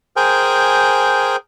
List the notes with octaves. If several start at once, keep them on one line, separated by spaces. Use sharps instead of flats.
G#4 A#4 C5 G5 G#5